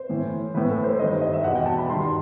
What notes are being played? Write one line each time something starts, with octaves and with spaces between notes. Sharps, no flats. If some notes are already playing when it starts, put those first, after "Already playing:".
Already playing: C5
A2 E3
A2 E3 B4
A4
C5
G2 D#3 D#5
C5
D#5
E5
E2 B2 F#5
G5
A5
B5
G2 D#3 C6